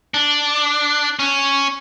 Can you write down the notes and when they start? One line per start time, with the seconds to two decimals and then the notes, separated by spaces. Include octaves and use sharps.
0.14 D4
1.19 C#4